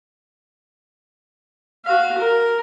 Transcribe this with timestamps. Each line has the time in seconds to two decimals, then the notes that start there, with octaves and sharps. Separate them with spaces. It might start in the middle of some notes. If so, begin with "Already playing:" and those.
1.85 F#4 F5
2.18 A#4